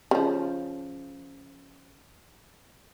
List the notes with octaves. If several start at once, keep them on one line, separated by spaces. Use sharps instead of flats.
C#3 F3